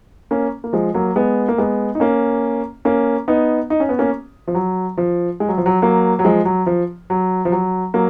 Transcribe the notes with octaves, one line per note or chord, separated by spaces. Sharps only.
A#3 C#4
A#3
F3 G#3
F#3 A#3
G#3 B3
A#3
G#3 B3
D#4
A#3 C#4
A#3 C#4
B3 D#4
D#4
C#4
B3
A#3 C#4
F3
F#3
F3
G#3
F#3
F3
F#3
F#3 A#3
F#3
F3 G#3
F#3
F3
F#3
F3
F#3
F#3 A#3